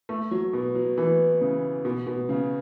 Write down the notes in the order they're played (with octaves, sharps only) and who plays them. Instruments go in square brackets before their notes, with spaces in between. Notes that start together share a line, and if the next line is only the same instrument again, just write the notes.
[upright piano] A3
F#3
B2
F#3
E3
C#3
B2
B2
C#3